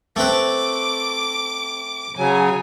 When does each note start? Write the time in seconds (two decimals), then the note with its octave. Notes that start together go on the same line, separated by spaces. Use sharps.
0.16 A3 C4 B4 D6
2.17 C#3 F#3 C#5 G#5